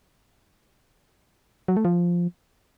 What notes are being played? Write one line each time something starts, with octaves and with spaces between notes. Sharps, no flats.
F#3
A3
F3